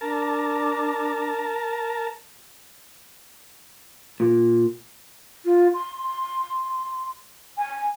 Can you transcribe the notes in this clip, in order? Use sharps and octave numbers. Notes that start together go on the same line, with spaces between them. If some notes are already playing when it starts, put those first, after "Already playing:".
D4 A#4 A5
A#2
F4
C6
G#5